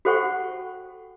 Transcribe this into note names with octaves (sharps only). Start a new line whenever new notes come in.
F#4 A4 C5 F#5 G5 C#6